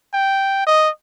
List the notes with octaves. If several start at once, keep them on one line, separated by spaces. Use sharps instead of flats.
G5
D#5